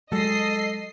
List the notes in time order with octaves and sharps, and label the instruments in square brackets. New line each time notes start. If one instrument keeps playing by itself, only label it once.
[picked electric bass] F#3 G#3 [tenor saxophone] A4 [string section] D#5 C7